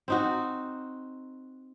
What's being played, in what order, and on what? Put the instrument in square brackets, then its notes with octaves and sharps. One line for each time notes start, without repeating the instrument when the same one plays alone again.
[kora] C4 D#4 F#4